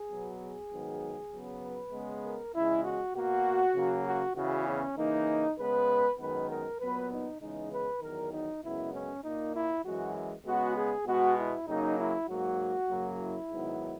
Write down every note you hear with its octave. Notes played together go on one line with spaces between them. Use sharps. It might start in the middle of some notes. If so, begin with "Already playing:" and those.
Already playing: G#4
B2 F#3 B3
G#4
G#2 D#3 F#3 B3
C#3 F#3 B3
B4
C#3 G#3 B3
A#4
E2 C#3 G#3 E4
F#4
B2 A#3 F#4
C#3 F#3 A#3
F#4
E2 C#3 E3 B3 F#4
C#4
C#3 E3 A#3 D#4
C#3 G#3 B3 B4
F#2 D#3 G#3 B3 B4
A#4
A#2 F#3 B3 B4
D#4
C#3 E3 G#3 B3 D#4
B4
E2 D#3 F#3 A#4
D#4
F#2 C#3 G#3 B3 E4
C#4
A#2 A#3 D#4
E4
F#2 E3 G#3 F#4
C#3 G#3 B3 F#4
G#4
B2 G#3 B3 F#4
E4
C#3 F#3 A#3 D#4
E4
G#2 F#3 A#3 F#4
F#2 C#3 F#3 A#3
E4
G#2 D#3 F#3 B3